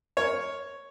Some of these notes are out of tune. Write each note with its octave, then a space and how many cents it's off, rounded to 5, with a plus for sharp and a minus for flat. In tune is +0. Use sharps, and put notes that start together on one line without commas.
A#4 +0 C#5 +0